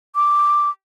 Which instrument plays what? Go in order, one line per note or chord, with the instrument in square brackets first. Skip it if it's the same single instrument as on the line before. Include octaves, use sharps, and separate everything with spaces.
[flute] D6